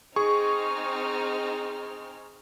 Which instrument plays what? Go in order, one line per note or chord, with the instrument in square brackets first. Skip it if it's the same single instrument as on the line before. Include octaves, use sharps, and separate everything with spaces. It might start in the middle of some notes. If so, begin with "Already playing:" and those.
[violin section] C4 D#4 F6 [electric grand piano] G#4 C#6